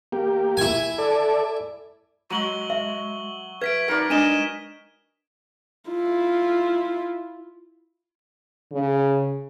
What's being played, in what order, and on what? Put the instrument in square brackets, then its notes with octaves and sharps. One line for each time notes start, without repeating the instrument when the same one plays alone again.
[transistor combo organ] A#3 G4
[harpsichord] E4 G#5
[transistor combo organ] A4 D5
[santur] F#3 [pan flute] G#3 [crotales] C#6 F#7 G7
[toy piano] E5
[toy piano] B4 [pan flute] E5 [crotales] G#6 B6 D7
[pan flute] D#4 [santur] A#4 D5
[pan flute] G#3 [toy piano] D4 [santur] D#4 [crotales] D#7 E7 G7
[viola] E4 F4
[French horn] C#3